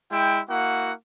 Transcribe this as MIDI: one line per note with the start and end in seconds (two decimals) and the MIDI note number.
0.12 0.40 56
0.12 0.40 64
0.12 0.40 79
0.49 0.92 58
0.49 0.92 64
0.49 0.92 66
0.49 0.92 78